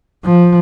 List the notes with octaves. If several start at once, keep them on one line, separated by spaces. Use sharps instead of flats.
F3